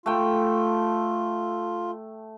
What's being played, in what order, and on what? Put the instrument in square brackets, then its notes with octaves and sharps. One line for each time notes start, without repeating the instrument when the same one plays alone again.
[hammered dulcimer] A3 G5 [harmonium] F4